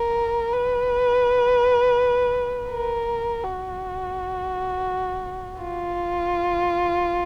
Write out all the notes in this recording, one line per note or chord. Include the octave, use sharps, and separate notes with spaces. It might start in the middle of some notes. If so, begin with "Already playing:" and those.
Already playing: A#4
B4
A#4
F#4
F4